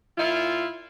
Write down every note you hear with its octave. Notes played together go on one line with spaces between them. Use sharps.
A#2 E4 F4